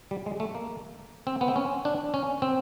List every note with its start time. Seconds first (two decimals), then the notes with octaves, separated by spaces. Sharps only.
0.11 G3
0.26 G#3
0.40 A3
0.55 A#3
1.27 C4
1.41 B3
1.48 C4
1.56 C#4
1.85 D4
2.14 C#4
2.42 C4